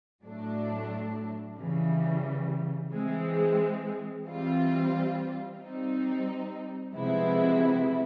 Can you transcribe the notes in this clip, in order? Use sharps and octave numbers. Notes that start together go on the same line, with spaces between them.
A2 F#3 A3 D4
C#3 E3 G3
E3 G#3 C4
E3 G3 C4 F4
G3 C4 D#4
C3 F3 G#3 B3 E4